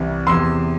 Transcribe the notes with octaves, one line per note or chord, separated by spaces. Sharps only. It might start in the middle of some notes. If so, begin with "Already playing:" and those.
Already playing: C2 C3 E3
E2 C3 E3 C6 E6